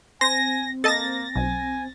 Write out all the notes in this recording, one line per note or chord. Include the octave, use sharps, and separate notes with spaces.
C4 C5 G#5 A#6
A#3 A4 D#5 A5 A6 A#6
B1 G#5